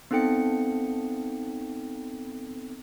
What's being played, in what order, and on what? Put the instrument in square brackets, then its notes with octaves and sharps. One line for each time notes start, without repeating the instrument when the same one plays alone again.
[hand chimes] B3 C4 D#4 A4 G5 C#7